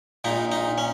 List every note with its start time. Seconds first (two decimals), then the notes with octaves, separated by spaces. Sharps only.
0.24 A#1 A#2 D#4
0.51 D#4
0.78 C#4